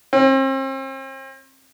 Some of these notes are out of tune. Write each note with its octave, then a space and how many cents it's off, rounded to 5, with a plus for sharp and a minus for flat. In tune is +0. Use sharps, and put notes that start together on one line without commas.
C4 +40